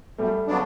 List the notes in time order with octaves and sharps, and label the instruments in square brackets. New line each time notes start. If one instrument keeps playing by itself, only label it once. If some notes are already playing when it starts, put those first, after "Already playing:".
[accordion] F#2 [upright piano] G3 A3
[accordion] C#3 F#3 B3 D4